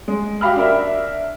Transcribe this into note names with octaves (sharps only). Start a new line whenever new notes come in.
G#3
F#4 G4 F5 B5 F6
D4 A#4 E5